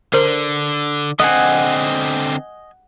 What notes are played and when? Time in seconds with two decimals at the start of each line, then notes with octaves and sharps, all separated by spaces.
0.14 D3 A#4 C5
1.20 D3 C4 D#5 F#5 G#5